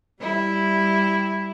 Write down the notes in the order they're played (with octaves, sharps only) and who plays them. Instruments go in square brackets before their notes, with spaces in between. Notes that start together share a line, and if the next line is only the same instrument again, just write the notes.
[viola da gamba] G3 E4